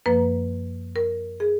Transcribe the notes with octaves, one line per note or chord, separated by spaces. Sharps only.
F#2 F3 A#3 B4
A#4
G#4